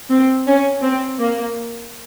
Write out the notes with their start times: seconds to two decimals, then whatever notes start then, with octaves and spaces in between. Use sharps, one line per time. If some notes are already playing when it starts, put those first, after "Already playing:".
0.11 C4
0.47 C#4
0.83 C4
1.19 A#3